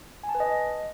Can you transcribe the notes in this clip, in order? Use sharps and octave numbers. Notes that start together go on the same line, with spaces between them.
G#5
A5
B4
D#5